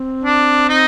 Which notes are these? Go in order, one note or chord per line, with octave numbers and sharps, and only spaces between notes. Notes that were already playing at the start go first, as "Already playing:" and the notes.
Already playing: C4
D4
D#4